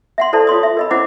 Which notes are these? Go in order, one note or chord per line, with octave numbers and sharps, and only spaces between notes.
E5 F#5 C6
E4 A4 C5 D5 A5 A#5
F4 C#5 C6 D#6
E5
A#4 D#5 B5
C#4 E4 C5 F#5 D6